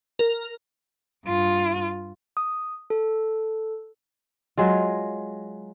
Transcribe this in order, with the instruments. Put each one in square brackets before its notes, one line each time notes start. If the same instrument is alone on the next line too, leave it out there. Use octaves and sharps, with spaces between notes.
[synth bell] A#4
[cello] G2 F4
[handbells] D#6
A4
[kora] F#3 G#3 F4